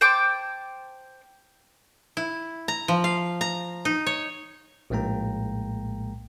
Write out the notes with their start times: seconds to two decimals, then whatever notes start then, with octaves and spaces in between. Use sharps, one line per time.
0.01 C5 G5 A5 D6
2.17 E4
2.68 A#5
2.88 F3
3.04 F5
3.41 A#5
3.85 D#4
4.06 C#5
4.90 A#1 A2 G#3 A#3 G5 A#5